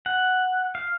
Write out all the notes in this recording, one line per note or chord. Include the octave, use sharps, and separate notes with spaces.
F#5
F5